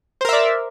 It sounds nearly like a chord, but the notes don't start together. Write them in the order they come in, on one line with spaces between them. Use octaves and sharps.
C5 A#4 E5 D5